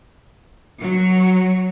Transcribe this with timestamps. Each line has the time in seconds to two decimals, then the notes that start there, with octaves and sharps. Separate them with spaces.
0.79 F#3